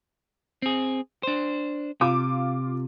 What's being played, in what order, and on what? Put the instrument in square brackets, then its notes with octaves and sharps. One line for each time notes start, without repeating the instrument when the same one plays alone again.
[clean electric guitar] C4 G#4
D4 C5
[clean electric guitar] C3 [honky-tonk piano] F4 D6